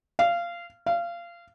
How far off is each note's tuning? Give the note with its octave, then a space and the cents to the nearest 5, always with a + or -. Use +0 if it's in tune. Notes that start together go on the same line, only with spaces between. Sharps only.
F5 -20
F5 -25